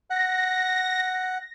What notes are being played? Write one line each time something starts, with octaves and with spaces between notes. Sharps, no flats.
F#5 A#6